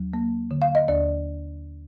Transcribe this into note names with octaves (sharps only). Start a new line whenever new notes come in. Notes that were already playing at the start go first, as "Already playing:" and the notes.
Already playing: D#2 F#3
A#3
D3
F5
D#5
D#2 D5